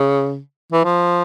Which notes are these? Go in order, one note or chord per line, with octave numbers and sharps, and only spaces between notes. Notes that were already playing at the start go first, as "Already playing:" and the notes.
Already playing: C#3
E3
F3